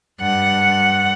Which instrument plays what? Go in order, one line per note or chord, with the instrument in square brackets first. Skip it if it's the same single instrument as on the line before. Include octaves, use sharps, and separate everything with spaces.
[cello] G2 F#5